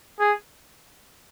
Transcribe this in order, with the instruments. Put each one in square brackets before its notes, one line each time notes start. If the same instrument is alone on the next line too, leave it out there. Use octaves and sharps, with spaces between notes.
[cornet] G#4